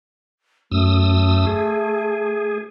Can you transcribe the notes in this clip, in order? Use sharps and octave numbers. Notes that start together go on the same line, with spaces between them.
F#2 A3 D#6 E6
G#4